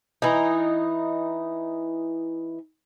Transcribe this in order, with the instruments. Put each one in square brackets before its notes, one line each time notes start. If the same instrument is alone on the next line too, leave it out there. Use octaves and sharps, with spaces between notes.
[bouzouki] E3 D#4